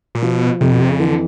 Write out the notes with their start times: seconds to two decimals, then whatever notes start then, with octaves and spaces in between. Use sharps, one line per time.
0.15 A#2
0.22 B2 F3
0.61 F2 C3
0.71 B2
0.81 C3
0.90 C#3
1.00 D3 E3